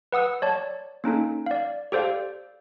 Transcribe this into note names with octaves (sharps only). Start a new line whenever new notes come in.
B4 F#5 D#6 E6
C#5 D5 A5
A#3 C#4 D#4 A4
D5 F5
G4 A4 C5 D5 F5